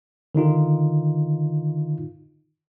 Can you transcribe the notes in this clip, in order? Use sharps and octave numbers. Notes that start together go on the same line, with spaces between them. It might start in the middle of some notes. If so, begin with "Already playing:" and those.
D3 D#3 D#4 F4